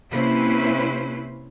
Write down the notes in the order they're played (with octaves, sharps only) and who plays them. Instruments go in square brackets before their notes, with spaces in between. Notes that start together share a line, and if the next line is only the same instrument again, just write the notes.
[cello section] C3 A#3 C#4 E4 B4 C5